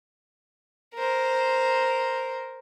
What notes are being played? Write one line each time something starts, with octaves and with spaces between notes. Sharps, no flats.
A#4 C5